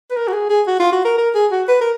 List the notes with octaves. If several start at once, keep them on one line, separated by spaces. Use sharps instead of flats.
B4
A#4
F#4
G#4
G#4
F#4
F4
F#4
A#4
A#4
G#4
F#4
B4
A#4